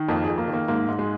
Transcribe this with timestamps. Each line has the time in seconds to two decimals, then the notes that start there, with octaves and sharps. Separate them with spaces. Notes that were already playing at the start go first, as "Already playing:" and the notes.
Already playing: D#3
0.08 F2 A#3
0.24 G#4
0.29 F2
0.38 A#3
0.48 D#3
0.54 A#3
0.68 G#2 A#3
0.88 G#2
0.99 G#3